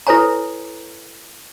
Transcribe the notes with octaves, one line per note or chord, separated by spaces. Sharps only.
E4 A4 B4 C#5 G#5 A#5